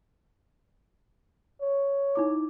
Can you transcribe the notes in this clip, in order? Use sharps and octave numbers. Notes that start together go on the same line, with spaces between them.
C#5
D#4 E4 D6